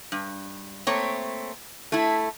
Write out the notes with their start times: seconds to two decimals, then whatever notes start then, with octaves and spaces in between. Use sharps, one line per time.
0.12 G2
0.87 A3 A#3 C4 C#5
1.92 A3 E4